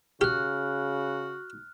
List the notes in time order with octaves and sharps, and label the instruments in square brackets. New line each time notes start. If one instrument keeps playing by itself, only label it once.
[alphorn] C#3 [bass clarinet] F#4 [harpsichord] G4 [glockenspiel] F6 F#6